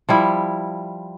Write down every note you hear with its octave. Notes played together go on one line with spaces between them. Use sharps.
F3 G3 E4